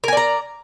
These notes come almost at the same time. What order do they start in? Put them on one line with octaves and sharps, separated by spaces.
A#4 G#5 D5 A#5